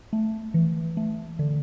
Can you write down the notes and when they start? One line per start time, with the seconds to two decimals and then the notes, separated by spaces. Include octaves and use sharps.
0.13 A3
0.54 E3
0.97 A3
1.39 D3